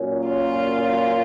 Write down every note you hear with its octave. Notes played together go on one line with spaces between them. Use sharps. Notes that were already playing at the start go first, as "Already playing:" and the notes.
Already playing: A#2 F#3 A#3 C#4
F4